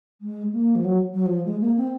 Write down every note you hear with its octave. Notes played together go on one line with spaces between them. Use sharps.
G#3
A#3
F3
F#3
F#3
F3
G#3
A#3
C4